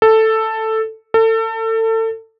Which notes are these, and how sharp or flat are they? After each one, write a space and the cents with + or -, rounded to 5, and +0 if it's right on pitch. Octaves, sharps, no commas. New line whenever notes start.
A4 +5
A4 +30